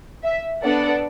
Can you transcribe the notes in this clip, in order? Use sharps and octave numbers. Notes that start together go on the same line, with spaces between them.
E5
B3 D4 A4 D5 F#5